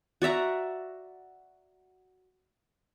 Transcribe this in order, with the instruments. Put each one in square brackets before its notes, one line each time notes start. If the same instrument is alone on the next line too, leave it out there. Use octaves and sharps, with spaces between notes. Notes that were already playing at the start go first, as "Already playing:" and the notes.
[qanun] F#4 D5 E5 A#5